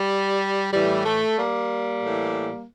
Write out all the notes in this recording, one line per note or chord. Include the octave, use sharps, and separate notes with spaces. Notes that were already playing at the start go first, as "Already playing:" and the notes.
Already playing: G3
A2 E3 G3
A3
G3 A#3
A2 E3